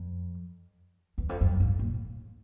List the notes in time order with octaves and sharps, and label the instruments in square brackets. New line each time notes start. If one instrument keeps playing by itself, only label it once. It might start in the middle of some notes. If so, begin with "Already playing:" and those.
Already playing: [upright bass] F2
E2
F2
F#2
G#2
A#2